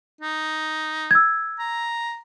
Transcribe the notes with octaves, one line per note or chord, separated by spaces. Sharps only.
D#4
E6 G#6
A#5